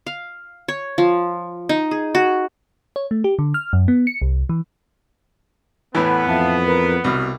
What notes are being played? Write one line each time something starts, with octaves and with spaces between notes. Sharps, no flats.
F5
C#5
F3
D#4
G#4
F#4
C#5
A3
G4
D3
F6
F#2
B3
C#7
C2
E3
E2 A2 E3 B3 A4 B5
F2 E5 F5 A5
A#4 B4
C2 B2 D#6 F6